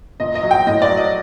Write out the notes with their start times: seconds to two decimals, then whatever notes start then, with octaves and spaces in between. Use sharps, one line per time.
0.20 A#2 D#5
0.35 D#5
0.43 F#3
0.51 G5
0.67 A2 D#5
0.82 D5
0.90 F#3
0.97 D#5